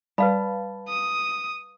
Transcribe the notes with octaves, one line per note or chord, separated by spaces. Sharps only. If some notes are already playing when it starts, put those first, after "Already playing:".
G3 B4 F5 A5 B5
D#6